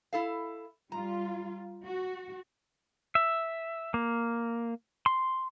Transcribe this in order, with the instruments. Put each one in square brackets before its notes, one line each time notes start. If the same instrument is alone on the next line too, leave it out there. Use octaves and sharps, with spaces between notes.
[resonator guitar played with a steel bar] E4 A4 F5
[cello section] G3 F4 [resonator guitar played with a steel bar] A#5
[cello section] F#4
[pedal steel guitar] E5
A#3
C6